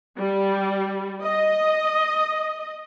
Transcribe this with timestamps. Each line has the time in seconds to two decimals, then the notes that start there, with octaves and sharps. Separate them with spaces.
0.18 G3
1.22 D#5